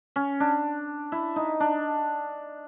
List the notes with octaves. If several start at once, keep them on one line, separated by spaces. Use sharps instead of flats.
C#4
D4
E4
D#4
D4